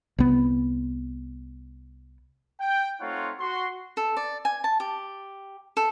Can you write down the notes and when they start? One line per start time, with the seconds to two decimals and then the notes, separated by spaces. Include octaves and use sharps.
0.18 C2 B3
2.60 G5
3.00 A3 C4 D#4 F4 C#5 F#5
3.40 F#4 C6
3.97 A4
4.17 D5
4.45 G#5
4.64 A5
4.80 G4
5.77 A4